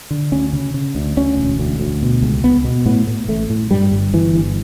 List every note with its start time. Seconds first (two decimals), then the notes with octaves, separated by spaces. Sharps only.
0.11 D3
0.32 D2 C#4
0.53 C#3
0.74 C#3
0.95 D2
1.17 D2 C#4
1.37 E1
1.60 D2
1.80 D2
2.02 B2
2.22 C#2
2.44 C#2 B3
2.64 B2
2.86 A2 B3
3.07 A2
3.28 A1 A3
3.50 A2
3.71 G2 G3
3.92 G1
4.13 G1 E3
4.35 G2